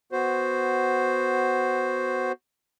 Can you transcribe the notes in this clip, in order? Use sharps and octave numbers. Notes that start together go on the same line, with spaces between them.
B3 F#4 C5